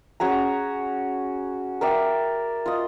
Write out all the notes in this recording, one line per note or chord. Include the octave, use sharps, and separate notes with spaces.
C#4 F#4 G#4 A#5
A#4 D5 E5 G5
F4 D#5